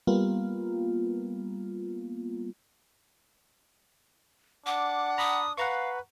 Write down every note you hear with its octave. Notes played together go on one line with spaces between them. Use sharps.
G3 A#3 B3 F4
D4 F#5 D6
A#5 B5 D#6
B4 F5 F#5 A#5 C#6